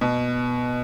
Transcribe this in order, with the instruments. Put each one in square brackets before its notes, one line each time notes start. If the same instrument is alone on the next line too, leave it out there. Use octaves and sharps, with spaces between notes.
[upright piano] B2